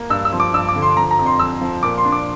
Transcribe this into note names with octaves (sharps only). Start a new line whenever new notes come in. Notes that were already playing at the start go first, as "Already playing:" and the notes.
Already playing: A#3
G2 E6
E6
F3
D6
G2 E6
D6
D3
C6
F3 A#5
A#5
F2
C6
F2 E6
F3
A#2 D6
C6
D4
D6